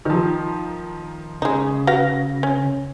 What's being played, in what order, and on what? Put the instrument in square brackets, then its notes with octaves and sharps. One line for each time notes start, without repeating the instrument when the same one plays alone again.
[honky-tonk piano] D#3 F3
[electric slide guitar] C#3 [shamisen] G#3 D#4
[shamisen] F#4 B4 F5 [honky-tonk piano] A#6
[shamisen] C#4